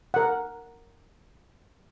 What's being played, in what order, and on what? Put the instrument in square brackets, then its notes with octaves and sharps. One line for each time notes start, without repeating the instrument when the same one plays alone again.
[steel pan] A#4 F#5